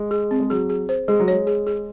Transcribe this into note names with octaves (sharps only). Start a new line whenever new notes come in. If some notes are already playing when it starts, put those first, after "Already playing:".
Already playing: G#3
G#4
C4
G#3
F#3 G#4
G#4
C5
G#3 G#4
F#3
G#3 C#5
G#4
G#4